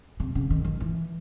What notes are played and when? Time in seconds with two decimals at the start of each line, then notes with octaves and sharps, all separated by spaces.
0.20 C3
0.35 C#3
0.50 D#3
0.65 D#3
0.80 E3